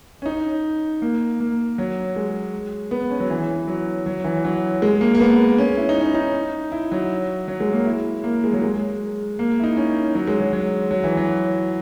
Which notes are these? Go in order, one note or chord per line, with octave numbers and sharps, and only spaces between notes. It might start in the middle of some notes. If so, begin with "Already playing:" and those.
C#4
D#4
A#3
A#3
F#3
G#3
B3
C#4
F#3
E3
F#3
F#3
E3
F#3
G#3
A#3
A#3
B3
C#4
E4
D#4
C#4
D#4
E4
F#3
F#3
G#3
A#3
E4
A#3
G#3
F#3
G#3
A#3
E4
D#4
C#4
F#3
G#3
F#3
F#3
F#3
E3
F#3